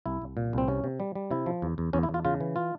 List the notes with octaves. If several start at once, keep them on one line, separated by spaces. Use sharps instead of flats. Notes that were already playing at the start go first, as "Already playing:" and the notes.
C2 E4
C2
A#2
C2 C4
C3 C#4
C3
G3
G3
C3 E4
F3
E2
E2
E2 C#4
E4
E2
F4
C#3 F4
E3
F4